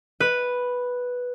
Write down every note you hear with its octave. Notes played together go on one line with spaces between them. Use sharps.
B4